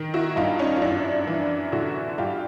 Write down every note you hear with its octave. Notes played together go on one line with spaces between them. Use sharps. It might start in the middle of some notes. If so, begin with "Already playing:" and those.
Already playing: D#3
E4 F#4
G2 D#4 F4
C#4 D#4
F4
F#2 D4 E4
E3
D3 E4 F#4
G2 F4 G4